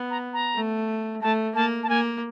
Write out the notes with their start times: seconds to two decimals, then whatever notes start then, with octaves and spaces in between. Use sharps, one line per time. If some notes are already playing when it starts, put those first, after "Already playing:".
Already playing: B3
0.11 A#5
0.33 A#5
0.55 A3
1.22 A3 A5
1.55 A#3 A5
1.83 A5
1.89 A#3 G#5